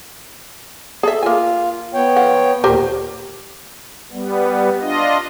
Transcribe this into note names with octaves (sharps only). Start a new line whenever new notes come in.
G#4 A4 E5
A#3 F4 G#5
B3 C#5 G5
F3 F#5
D#2 A#2 G4 A#4 C5
G3 B3
D4 F4 D#5